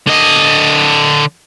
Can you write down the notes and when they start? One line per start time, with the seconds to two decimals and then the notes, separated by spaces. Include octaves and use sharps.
0.07 D3 D#5